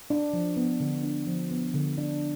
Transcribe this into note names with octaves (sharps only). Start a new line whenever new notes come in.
D4
F3
B3
D3
D4
F3
B3
D3
D4